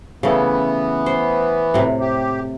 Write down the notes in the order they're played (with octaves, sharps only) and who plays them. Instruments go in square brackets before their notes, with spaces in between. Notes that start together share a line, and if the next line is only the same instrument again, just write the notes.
[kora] C#3 A3 [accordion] E3 B3
[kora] C5
A2 C3
[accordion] G4